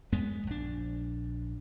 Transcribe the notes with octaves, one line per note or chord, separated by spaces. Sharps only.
F#2 G#3 B3
A#1 D4